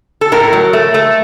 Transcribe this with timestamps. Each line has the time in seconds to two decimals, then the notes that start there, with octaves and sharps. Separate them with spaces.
0.21 A4
0.32 A2 A#4
0.53 F#3
0.73 A3
0.94 A3